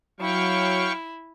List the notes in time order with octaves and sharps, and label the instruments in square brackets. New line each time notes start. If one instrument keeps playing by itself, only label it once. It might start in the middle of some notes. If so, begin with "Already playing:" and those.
[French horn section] F#3 [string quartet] E4 [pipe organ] F5 G5 C#6